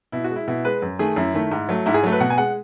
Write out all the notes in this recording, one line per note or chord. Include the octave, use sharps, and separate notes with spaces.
B2 E4
F#4
G#3
E4
B2 E4
G#3 B4
F#2
D#3 A3 G#4
F#2 E4
D#3 A3
G#2
F#3 A3
G#2 E4
G#4
F#3 A3
B4
B2 F#5
G#5
G#3 F#5